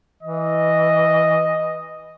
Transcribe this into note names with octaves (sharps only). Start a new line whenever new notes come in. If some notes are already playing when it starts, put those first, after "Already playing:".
E3 D#5